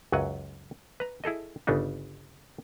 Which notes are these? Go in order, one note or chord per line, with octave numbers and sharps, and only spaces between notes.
C#2 F#2 F#3 F#5 G#5
B4 A#5
E4 G#4 A4 D#5
G1 C#3 B3 D4 D#4